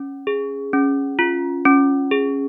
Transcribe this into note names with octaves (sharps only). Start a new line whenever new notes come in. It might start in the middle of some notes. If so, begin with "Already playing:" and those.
Already playing: C#4
G#4
C#4
F4
C#4
G#4